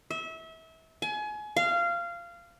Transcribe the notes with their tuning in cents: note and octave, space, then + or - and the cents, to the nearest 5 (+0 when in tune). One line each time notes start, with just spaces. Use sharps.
E5 -30
G#5 +30
F5 -20